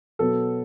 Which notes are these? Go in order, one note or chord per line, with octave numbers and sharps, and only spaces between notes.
B2 F#3 B3 A4